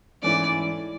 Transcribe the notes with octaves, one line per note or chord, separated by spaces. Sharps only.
G#2 E3 A3 C#4 E4 D5